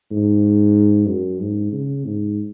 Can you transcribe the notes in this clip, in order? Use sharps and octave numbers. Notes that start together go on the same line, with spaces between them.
G#2
F#2
G#2
C#3
G#2